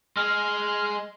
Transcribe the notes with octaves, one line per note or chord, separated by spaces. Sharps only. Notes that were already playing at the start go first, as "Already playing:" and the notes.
G#3 G#4 F6